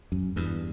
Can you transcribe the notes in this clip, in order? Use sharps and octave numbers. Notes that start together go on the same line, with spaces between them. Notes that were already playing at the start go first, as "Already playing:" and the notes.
F#2
E2 G2